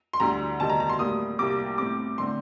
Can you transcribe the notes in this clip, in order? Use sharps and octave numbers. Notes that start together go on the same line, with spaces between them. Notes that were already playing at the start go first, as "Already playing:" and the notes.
C6
D2 D3 G3 A#5
D2 C3 D#3 G3 A5
A#5
A#5
C6
A2 G3 A#3 D#6
C2 C3 G3 A#3 D6
A2 A3 C4 D6
D3 A3 C4 C6